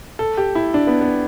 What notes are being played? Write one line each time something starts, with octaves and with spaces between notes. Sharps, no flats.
A4
G4
E4
D4
B3
B3